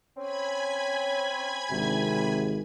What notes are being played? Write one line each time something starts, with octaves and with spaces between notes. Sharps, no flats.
C4 C#4 G#5 B5 G#6
G#1 D2 C3